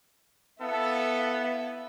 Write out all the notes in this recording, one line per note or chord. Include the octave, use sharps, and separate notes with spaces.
B3 E4 A4 E5 F5